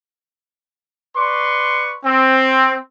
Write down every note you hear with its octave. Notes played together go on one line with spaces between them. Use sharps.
B4 D5 C6 C#6
C4